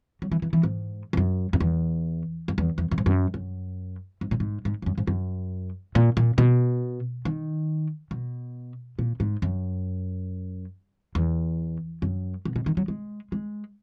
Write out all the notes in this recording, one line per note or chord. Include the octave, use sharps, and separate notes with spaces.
F#3
E3
E3
E3
G#2
G#2
F#2
F#2
E2
F#2
E2
E2
F#2
G#2
F#2
F#2
G#2
A#2
G#2
G#2
E2
F#2
G#2
F#2
A#2
A#2
B2
D#3
B2
A#2
G#2
F#2
E2
F#2
B2
B2
D#3
F#3
G#3
G#3